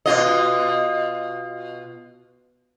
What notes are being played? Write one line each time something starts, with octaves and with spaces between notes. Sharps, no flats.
B2 F4 D#5